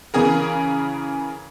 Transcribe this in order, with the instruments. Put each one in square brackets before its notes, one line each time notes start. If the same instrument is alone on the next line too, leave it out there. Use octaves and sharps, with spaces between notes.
[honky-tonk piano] C#3 E3 G#4 A#4